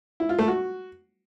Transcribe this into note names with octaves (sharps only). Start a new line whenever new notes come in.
E4
F4
A3
F#4